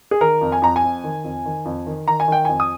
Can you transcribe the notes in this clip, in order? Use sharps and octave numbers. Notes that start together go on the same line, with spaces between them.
G#4
D#3 A#4
F2
G#5
F2 A#5
G#5
F2
D#3
F2
D#3
F2
D#3
D#3 A#5
G#5
D#3 G5
F2 G#5
D#6